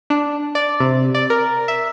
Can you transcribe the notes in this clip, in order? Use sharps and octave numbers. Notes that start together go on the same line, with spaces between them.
D4
D5
C3
D5
A#4
E5